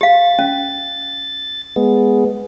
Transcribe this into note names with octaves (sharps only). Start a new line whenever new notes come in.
G4 F5 A6
C#4
G#3 B3